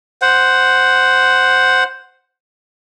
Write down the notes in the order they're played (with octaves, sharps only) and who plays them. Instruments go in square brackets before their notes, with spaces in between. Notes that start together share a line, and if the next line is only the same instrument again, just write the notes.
[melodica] C5 F#5